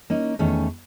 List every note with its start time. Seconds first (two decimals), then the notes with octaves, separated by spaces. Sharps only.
0.10 A#3 C#4 D#4
0.39 E2 D#3 A3 C#4